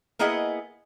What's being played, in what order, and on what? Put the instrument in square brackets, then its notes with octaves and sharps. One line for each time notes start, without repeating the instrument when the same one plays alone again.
[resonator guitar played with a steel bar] A#3 B3 E4 G#4 D#5 F#5